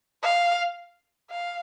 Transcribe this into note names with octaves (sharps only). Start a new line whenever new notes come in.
F5
F5